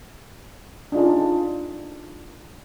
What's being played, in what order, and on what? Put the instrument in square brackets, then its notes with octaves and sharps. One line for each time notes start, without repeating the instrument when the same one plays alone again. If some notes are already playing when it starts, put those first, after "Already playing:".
[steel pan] D4 D#4 F4 G#4